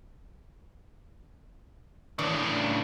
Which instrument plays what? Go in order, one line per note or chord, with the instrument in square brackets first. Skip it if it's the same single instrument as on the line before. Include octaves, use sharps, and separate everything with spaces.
[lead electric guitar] A2 C#3 [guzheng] E3 D4